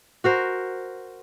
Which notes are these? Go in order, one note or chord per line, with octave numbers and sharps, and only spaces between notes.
F#4 A#4 C5